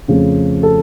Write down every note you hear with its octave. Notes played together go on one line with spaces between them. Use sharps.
F2 C#3 F3 A3 C4
A4